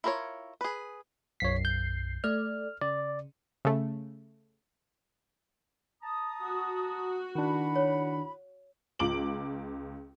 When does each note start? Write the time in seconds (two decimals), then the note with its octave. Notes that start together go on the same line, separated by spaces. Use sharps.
0.04 E4 F4 A#4 C5 C#5
0.61 G#4 B4
1.40 B1 F#2 C#5 B6 C7
1.65 G6
2.24 A3 D5 F6
2.81 C#3 D5
3.65 C#3 A3
6.02 A5 A#5 D#6
6.43 F#4
7.35 D#3 D4 E4 F#5 B5
7.75 C#5
8.99 C#2 F4 D6 D7 F#7